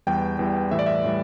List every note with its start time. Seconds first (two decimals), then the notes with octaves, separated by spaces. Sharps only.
0.07 E2 E3 G3 G5
0.39 E2 E3 G3
0.71 A2 E3 G3 E5
0.79 D5
0.86 E5
1.04 A2 E3 G3